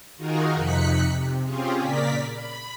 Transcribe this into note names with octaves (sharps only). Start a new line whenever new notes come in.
D#3 D#4 F4 F#4 G#4 A#4
F2 C3 D#4 F#6 B6 C#7
C3
C4 C#4 F4 G4 G#4
A#2 C#3 A#4 D5 B6
B5